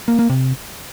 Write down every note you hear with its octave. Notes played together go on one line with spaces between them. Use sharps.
A#3
A#3
C3